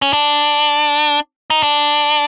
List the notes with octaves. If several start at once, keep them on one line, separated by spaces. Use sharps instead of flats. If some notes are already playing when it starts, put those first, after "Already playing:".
C#4
D4
D#4
D4